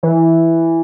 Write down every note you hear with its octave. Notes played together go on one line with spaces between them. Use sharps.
E3